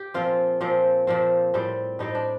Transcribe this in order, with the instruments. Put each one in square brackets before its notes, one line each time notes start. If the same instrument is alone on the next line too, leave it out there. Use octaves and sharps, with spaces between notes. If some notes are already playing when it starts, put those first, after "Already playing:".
Already playing: [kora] G4
A#2 F3 C4 F4
A#2 F3 C4
A#2 F3 C4
A2 G3 C4
A2 G3 C4 D#4
D4